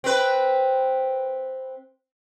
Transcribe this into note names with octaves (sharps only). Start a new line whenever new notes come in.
C4 B4